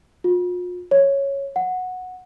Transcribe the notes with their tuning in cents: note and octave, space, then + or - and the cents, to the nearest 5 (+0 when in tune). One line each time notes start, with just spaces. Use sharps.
F4 +40
C#5 -5
F#5 -10